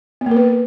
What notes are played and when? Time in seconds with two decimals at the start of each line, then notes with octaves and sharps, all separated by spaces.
0.21 B3
0.26 A#3
0.31 A#4
0.36 B4